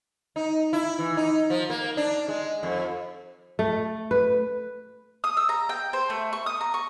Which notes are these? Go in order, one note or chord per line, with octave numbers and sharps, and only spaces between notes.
D#4
E4
E3
D#4
F3
A#3
D4
G#3
F2
A3
B4
D#6
E6
A#5
G5
C5
A3
C#6
D#6
A#5
C#6